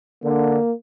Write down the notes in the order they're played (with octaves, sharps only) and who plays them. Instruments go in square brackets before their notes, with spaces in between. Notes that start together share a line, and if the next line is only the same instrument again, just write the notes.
[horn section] D3 [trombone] A#3